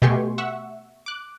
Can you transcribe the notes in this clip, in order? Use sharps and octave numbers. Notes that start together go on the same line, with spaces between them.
B2 A3 G4 G#5 C6 C#6
E5 F#5 C#6 E6
D6 F#6